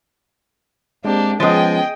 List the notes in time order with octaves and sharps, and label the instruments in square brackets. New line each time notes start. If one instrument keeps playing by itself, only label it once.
[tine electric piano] G#3 C4 [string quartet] A#3 D4 G4
[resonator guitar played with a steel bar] F3 G#3 [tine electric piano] B3 C#4 A6 [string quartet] G#4 D#5 G5